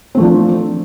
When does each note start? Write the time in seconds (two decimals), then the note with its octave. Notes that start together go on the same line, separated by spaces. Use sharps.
0.15 C4
0.17 A3
0.20 F3
0.23 D4